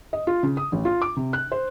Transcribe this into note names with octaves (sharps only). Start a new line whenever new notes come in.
D#5
F4
C#3
D#6
A1
F4
D6
C3
F#6
C5